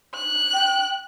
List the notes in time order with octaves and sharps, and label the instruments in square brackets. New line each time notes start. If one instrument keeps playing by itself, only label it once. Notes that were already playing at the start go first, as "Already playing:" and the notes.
[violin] F#6
[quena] G5